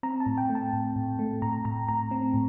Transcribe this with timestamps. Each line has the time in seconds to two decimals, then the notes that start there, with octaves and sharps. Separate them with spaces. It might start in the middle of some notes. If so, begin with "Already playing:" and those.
0.03 C4 A#5
0.20 A5
0.26 A2
0.38 G5
0.49 A3
0.55 A5
0.73 A2
0.96 A2
1.19 A3
1.42 A2 A#5
1.65 A2 A#5
1.88 A2 A#5
2.11 C4
2.34 A2